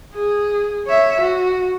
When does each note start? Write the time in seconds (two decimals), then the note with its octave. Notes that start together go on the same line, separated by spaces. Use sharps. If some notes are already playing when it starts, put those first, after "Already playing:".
0.14 G#4
0.87 C#5 E5
1.21 F#4